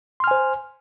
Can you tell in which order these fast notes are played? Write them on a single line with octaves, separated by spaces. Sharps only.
C6 F6 G#5 C5